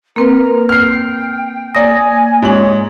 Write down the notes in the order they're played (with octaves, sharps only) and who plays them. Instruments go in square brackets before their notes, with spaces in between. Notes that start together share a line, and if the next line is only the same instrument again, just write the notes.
[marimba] A#3 C4 B4 [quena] A#4
[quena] G5 [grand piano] F6 C7
[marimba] A#3 A#6 [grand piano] D5 D#6 [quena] G#5
[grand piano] G#2 F#7 [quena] C#5